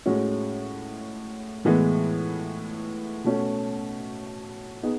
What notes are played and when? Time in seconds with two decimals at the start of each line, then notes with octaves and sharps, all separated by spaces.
0.06 A2 G#3 C#4 F#4
1.65 A2 E3 G#3 B3
3.24 B2 A3 C#4
4.83 B3 D#4 G#4